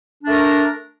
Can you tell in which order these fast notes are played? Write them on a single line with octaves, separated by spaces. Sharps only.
D4 A3 A#4